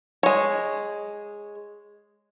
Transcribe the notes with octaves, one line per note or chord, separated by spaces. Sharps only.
G#3 C#5